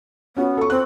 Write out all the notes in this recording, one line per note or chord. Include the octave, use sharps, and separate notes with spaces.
B3 C#4 F#4
A4 C#6
C4 F#6